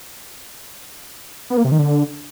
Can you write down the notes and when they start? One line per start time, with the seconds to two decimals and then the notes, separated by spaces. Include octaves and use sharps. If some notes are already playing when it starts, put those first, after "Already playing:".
1.50 B3
1.57 A#3
1.65 C3
1.72 D#3
1.79 D3